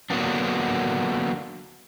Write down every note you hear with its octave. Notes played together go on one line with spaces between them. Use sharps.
D3 F#3 A#3 B3 D4